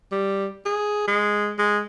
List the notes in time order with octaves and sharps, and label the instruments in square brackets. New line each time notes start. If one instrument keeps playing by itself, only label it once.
[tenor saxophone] G3
G#4
G#3
G#3